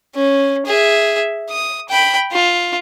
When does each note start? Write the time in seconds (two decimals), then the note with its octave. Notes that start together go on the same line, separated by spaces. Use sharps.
0.15 C#4
0.66 G#4 E5
1.49 D#6
1.89 G5 B5
2.32 F4